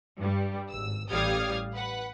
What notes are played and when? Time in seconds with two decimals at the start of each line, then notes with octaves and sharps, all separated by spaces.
0.20 G2 G3
0.70 G#1 E6
1.10 A1 G3 F5 D#6 F6 G#6
1.75 B4 F#5